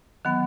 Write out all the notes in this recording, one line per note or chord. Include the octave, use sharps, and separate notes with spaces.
D#3 F#3 B3